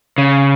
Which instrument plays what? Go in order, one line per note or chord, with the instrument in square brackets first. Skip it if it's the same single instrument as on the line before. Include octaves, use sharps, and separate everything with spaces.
[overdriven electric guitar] C#3